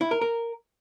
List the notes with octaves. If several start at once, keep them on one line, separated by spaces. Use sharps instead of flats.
E4
A#4
A#4